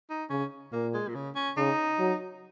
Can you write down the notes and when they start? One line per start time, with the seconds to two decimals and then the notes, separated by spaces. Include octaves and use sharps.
0.10 D#4
0.30 C#3 C#4
0.72 A#2 A#3
0.93 G#3
1.08 A#2
1.15 C#3
1.35 C#4
1.57 C#3 D#4
1.99 F#3